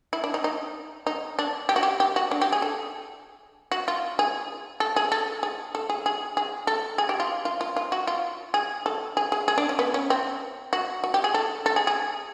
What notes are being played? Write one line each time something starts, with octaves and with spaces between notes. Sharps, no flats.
E4
D4
D#4
D#4
D#4
D4
G4
F#4
G4
G4
F#4
D4
G4
G#4
A4
F#4
F4
G#4
A4
G#4
A4
G#4
A4
G#4
G#4
G#4
A4
G#4
G4
F4
F4
F4
F4
F#4
F4
G#4
A4
G#4
G#4
G#4
D4
C#4
B3
C#4
C4
F#4
F#4
G4
G#4
A4
A4
G#4
G#4